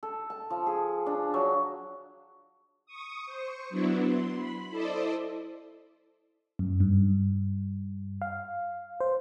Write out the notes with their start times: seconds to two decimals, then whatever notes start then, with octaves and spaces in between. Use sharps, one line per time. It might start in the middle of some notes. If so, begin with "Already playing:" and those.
0.03 A4
0.30 A5
0.50 F3
0.66 G#4
1.06 D4
1.34 F#3
2.86 C#6 D#6
3.26 C5 C#6
3.70 F#3 B3 D4 E4
4.03 C6
4.35 B5
4.70 E4 A4 C5 D5 D#5
6.59 F#2
6.80 G2
8.22 F5
9.00 C5